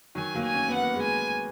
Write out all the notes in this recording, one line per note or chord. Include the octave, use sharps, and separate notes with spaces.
D#3 F#3 G#5
F#3 A#3
G#5
C#4
B3
F#5
A#3
G#3 B3
G#5